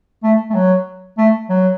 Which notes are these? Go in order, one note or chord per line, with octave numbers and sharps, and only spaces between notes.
A3
A3
F#3
A3
F#3